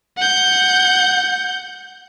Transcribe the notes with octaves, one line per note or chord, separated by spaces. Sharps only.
F#5 G6